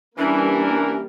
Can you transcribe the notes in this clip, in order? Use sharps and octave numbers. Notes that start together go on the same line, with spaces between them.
E3 G3 A#3 C#4 D4 A#4